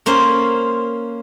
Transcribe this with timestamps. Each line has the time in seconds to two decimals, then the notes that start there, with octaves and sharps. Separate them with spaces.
0.06 A#3 C#4 C5